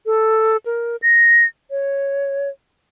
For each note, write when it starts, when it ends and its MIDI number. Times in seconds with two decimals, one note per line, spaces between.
0.06 0.57 69
0.66 0.96 70
1.02 1.45 94
1.71 2.49 73